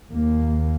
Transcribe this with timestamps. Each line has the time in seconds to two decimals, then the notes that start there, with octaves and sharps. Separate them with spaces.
0.11 D#2 A#3